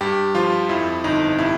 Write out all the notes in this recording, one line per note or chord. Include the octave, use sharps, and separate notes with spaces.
G2 G4
F3 F4
F2 E4
G1 D#4
C3 E4